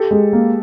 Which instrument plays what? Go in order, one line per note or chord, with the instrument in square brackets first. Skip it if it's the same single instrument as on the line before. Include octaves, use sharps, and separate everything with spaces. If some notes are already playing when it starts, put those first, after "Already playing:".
Already playing: [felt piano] G4 A4
[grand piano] G#3
A#3